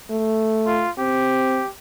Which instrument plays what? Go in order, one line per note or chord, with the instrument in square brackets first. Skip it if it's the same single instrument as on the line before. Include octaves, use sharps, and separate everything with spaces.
[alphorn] A3
[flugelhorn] F4
[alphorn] C4 [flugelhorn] G4